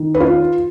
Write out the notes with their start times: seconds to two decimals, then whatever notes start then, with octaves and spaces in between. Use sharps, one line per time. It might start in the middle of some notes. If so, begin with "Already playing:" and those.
Already playing: D#3
0.14 B4
0.20 F4